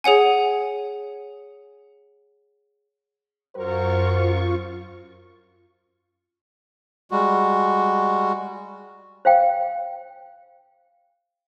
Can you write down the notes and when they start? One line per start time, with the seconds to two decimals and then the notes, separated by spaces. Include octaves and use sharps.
0.04 G#4 C#5 F#5 G#5
3.56 F#2 F#3 F4 A#4 C5 C#6
7.11 G3 G#3 F#4
9.25 C5 F5 G5